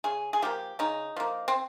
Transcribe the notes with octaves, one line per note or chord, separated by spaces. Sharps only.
C#3 G#4
G#4
F3 A#3 G4
C#3 D#4
F3 A#3
C4